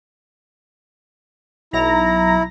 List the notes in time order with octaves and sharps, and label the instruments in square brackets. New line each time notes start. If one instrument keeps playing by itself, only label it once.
[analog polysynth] B1 A#5 A#6 [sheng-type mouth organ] E4